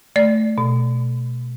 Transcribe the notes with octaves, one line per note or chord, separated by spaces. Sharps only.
A3 D5
B2